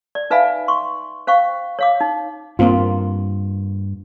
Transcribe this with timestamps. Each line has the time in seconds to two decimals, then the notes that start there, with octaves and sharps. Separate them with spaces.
0.15 D5
0.30 D#4 B4 E5 F5 G#5 B5
0.68 C6 C#6
1.27 C5 F5 G5 C#6
1.79 C#5 F5 D6
2.00 D#4
2.59 G2 A#3 C4 F4